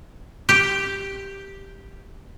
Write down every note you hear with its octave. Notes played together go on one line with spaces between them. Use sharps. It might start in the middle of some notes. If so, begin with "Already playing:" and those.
G4 G5